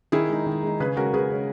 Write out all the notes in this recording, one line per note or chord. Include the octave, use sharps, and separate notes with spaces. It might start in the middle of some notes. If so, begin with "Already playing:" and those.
D#3 E4 G#4
G#3 D#4
D#3
G#3 D#4
C#3 G#4 B4
G#3 C#4 F#4 A#4
C#3 G#4 B4
G#3 C#4